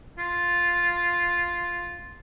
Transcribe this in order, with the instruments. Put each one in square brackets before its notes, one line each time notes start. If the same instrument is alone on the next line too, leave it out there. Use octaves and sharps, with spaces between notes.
[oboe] F4